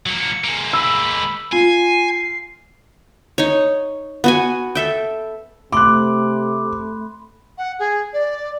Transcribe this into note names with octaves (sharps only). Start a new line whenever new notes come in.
F#3 A#3 C#7
G#3 A#3
B5 E6
F4 G#5 C7
D#4 C#5
B3 F#4 G#5
A4 E5 G5
C3 A3 B5 C6 D6 F#6
F#5
G#4
D5